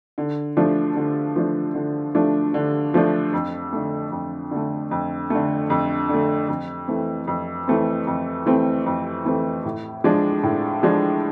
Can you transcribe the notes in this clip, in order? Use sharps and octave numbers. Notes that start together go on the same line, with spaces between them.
D3
F3 A3 D4
D3
F3 A3 D4
D3
F3 A3 D4
D3
F3 A3 D4
F2
D3 A3
F2
D3 A3
F2
D3 A3
F2
D3 A3
F2
E3 A3 C4
F2
E3 A3 C4
F2
E3 A3 C4
F2
E3 A3 C4
A2
F3 G#3 D4
A2
F3 G#3 D4